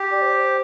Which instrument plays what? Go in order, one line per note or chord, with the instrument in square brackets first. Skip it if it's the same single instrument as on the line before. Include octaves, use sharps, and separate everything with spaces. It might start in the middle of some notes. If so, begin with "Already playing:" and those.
Already playing: [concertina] G4
[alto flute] D5
C5